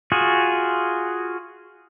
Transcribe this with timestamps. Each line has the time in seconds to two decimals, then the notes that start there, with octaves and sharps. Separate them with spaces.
0.12 F4 F#4 G#4